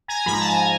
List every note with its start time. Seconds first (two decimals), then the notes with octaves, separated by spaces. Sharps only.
0.08 G#5 A#5
0.26 G#2 F3 B5
0.33 A#5
0.41 A5
0.48 G#5 A#5